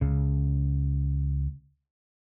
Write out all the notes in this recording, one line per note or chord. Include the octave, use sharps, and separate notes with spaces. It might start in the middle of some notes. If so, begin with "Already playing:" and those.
C#2 C#3